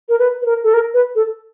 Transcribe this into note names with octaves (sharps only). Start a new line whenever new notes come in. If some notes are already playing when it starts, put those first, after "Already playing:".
A#4
B4
B4
A#4
A4
A#4
B4
A4